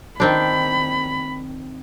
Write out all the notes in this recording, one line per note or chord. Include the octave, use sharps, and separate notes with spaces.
D#3 C4 D4 B5